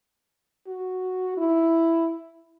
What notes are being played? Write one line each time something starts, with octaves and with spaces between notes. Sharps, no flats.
F#4
E4